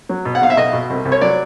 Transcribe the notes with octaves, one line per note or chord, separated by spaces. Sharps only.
F#3
B2
F#5
B1 F5
E5
B1 D#5
B2
C2
C2
C#5
F#3 D5